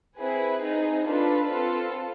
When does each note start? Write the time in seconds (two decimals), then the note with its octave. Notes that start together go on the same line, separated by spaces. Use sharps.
0.19 C4 E4 G#4 B4
0.63 C4 D#4 G#4
1.06 D4 F4 A4 B4
1.50 C4 F4 A4